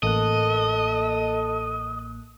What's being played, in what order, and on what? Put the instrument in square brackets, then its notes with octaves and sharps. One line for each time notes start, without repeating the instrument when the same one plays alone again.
[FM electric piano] A1 A#3 F#6 [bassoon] A4 [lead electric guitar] D#5